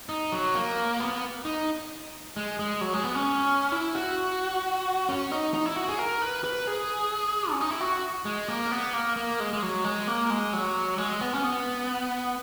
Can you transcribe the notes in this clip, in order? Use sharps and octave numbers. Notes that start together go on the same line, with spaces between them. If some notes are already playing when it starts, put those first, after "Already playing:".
D#4
F#3
A#3
B3
D#4
G#3
G#3
F#3
G#3
B3
C#4
E4
F#4
C#4
D#4
D#4
E4
F#4
G#4
A#4
B4
B4
G#4
C#4
D#4
E4
F#4
G#3
A#3
B3
A#3
A#3
G#3
G#3
F#3
G#3
A#3
G#3
F#3
G#3
B3
C#4
B3